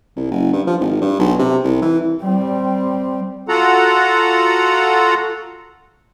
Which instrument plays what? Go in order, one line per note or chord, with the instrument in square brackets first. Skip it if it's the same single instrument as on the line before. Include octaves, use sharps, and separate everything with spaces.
[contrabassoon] C2
F#1
G2
F3
G#1
G2
B1
C3
C2
E3
[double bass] G3 C4
[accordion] F4 F#4 A4 F#5 A#5